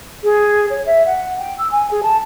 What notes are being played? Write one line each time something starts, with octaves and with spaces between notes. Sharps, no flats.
G#4
C#5
E5
F#5
G5
E6
G#5
G#4
A5